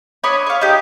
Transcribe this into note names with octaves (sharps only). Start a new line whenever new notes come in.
D4 C#5 D#5 B5
C#5 F5
D#4 G4